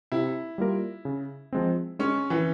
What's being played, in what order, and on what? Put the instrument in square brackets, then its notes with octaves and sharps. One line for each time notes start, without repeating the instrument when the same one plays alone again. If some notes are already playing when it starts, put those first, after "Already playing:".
[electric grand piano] C3 [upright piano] E4
[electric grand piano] G3 A#3 F4 A#4
C#3
F3 G#3 C4
[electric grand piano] G#3 [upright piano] C#4
[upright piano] E3